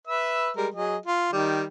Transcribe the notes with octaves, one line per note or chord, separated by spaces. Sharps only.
B4 E5 E6
G3 G#3 A#4
F#3 G#4 D#5
F4
D#3 G3